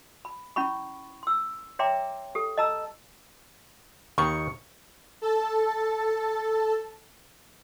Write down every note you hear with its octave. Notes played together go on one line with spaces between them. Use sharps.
B5
C#4 E4 B5 C#6
C6 E6
C#5 E5 G5 A#5 C6 D6
G4 A4
D#5 A5 A#5 E6
D#2 D#3 C#6
A4 A5